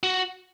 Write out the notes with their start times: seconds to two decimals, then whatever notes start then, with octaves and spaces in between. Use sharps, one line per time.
0.03 F#4